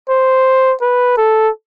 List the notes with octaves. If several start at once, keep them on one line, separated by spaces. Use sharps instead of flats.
C5
B4
A4